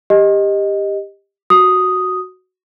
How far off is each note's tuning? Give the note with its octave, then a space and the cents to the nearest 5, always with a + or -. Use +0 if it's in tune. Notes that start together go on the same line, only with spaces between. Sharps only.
G4 +15 D#5 +0
F#4 +0 D#6 +0